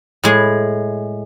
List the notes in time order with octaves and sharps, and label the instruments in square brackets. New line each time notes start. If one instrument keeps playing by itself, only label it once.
[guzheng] A2 G#3